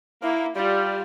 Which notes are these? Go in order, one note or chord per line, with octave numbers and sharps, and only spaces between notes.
A#3 E4
G3 F4